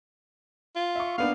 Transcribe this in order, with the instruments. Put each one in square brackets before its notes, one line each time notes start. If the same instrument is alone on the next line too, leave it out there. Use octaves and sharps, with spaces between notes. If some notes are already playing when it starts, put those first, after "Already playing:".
[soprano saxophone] F4
[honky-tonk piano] E5 C#6
[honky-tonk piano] A#3 B3 D4 [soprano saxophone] F5